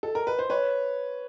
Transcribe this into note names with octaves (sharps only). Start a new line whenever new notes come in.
A4
A#4
B4
C5
B4 C#5